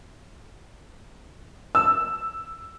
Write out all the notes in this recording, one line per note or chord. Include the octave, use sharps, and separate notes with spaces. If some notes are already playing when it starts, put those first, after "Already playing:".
E6